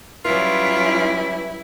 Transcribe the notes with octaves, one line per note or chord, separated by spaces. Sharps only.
F#3 G3 C#4 E4 F4 B4